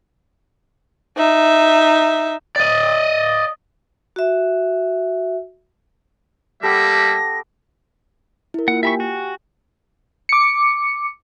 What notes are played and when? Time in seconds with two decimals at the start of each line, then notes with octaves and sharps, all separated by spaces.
1.17 D#4 E5
2.56 D5 D#5
4.16 F#4 E5
6.63 G3 A#3 B3 G4 A4 E5 A#6
8.54 E4 A#4
8.68 A#3 F4 F#5
8.83 G4 E5 G5 G#5 B5 C#6
9.00 F#4
10.29 D6 C#7